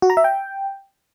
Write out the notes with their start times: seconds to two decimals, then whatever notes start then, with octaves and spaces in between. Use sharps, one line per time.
0.02 F#4
0.10 A#5
0.17 E5
0.24 G5